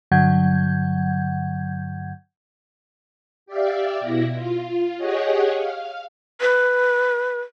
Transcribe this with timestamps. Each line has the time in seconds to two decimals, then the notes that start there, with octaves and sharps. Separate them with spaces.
0.11 G2 D3 F#3 F#5 G6 G#6
3.46 G4 D5 E5 F5
4.00 B2 E4 A#6
4.34 F4
4.96 G4 G#4 C#5 D#5 F#5
5.56 F5
6.41 B4